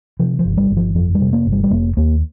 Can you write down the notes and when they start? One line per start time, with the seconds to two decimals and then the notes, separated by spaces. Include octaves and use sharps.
0.19 C3 F3
0.39 F3
0.45 G1
0.57 G3
0.70 G1
0.77 F3
0.95 F2 F3
1.15 G3
1.21 C3
1.33 A#3
1.47 G1
1.52 G3
1.63 G3
1.71 F1 A#3
1.97 D#2 A#3